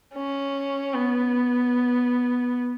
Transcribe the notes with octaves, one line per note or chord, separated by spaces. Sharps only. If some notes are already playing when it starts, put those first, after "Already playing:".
C#4
B3